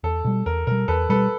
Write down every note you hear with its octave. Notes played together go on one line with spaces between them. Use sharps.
E2 A4
B2 G3
E2 A#4
B2 G3 A#4
E2 A4 B4
B2 G3 A4 B4